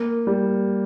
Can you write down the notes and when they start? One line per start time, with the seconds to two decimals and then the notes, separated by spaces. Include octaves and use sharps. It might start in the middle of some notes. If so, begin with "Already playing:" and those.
Already playing: A#3
0.27 G3